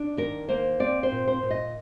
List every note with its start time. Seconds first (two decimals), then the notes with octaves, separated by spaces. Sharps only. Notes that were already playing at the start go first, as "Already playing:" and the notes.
Already playing: D4
0.17 D#2 A#4
0.49 A#3 C5
0.80 C4 D5
1.03 C5
1.12 A#2
1.28 C5
1.43 A#2
1.51 D#5